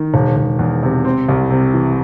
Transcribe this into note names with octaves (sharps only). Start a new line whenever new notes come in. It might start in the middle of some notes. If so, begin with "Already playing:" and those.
Already playing: D#3
E1
E1
E2
C3
C4
C2
C3
E3